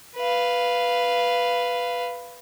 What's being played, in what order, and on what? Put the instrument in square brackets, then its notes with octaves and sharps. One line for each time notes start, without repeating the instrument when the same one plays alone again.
[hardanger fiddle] B4 F5